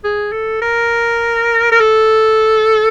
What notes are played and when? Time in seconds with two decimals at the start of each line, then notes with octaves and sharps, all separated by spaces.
0.04 G#4
0.32 A4
0.62 A#4
1.72 A#4
1.80 A4